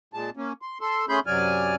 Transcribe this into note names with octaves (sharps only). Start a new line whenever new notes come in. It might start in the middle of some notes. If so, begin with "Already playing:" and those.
A#2 G#3 A5
A#3 C#4
C6
A4 C6
A3 C#4 G#4 B5 C6 G6
F#2 C3 F#3 D5 G#5 F6